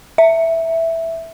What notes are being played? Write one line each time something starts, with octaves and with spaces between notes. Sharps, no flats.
E5